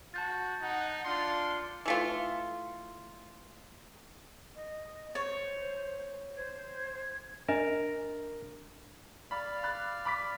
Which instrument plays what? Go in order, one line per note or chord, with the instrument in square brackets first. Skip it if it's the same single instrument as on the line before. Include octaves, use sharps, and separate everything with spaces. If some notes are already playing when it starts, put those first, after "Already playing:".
[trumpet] F#4 [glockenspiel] A5 G6 A6
[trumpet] D#4 [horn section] F#5
[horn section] D4 F4 [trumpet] C6 [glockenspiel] C#7
[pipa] E3 A3 F4
[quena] D#5
[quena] C5 [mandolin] C#5
[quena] C5 [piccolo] G#6
[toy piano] D4 D#5 [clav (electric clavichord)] A#4
[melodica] D5 F5 [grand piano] B5
[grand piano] B5 F#6 A6
B5 D6 B6